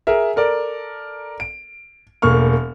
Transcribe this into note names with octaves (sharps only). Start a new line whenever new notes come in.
G#4 A#4 E5
A4 A#4 D5
D7
E1 A3 A#3 C#6 F6